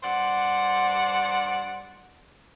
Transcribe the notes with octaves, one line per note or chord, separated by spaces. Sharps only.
G2 C5 D5 F#5